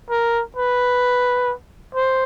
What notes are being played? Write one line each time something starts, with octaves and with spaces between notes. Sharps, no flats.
A#4
B4
C5